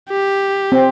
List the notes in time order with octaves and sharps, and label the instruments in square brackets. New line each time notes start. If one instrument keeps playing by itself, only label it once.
[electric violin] G4
[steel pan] C4